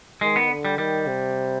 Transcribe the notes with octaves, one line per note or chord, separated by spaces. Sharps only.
D#3 G#3
B3
D3
G3
D#3 G3
C3